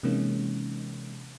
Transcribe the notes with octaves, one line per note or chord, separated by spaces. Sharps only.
C3 E3 G#3 A#3 C#4 D#4